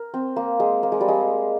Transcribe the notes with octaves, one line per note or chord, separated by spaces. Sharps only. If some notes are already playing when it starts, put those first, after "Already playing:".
Already playing: A#4
C4
A#3
G#3
A#3
G#3
G3
G#3